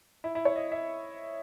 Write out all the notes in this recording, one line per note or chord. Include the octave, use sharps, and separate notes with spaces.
E4
E4
C#5
D#5
E5